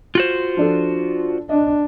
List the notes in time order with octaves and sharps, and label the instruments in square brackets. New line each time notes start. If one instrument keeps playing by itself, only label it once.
[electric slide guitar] F4 F#4 C5
[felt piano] F3 D4 A4
[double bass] D4 [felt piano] D#5